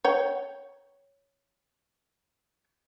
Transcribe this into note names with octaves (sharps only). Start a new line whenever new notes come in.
C#5 G5